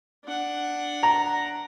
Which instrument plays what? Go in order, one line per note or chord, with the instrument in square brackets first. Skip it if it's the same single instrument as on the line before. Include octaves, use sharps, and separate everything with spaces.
[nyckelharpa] D4 F#5
[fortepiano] A#5